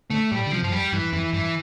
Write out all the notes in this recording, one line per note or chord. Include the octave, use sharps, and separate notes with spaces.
D3 A3
A2 G3
D3
C3 F3
G2 F3
F2 G3
G2 E3
F2 E3
G2 E3